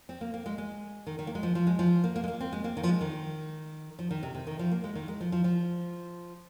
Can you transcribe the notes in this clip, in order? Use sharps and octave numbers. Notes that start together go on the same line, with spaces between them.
C4
A#3
A#3
G#3
G#3
D#3
D#3
A#3
G#3
F3
F3
G#3
F3
A#3
A#3
G#3
A#3
C4
G#3
A#3
D#3
F3
G#3
D#3
F3
D#3
C3
C3
D#3
F3
A#3
G#3
D#3
G#3
F3
F3
F3